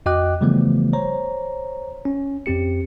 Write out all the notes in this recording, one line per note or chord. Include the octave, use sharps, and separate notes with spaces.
F2 F#4 D#5 G5 D6 F#6
C#3 E3 F3 G3 A3 B3
C5 C#5 A#5
C#4
F2 C4 G4 C#7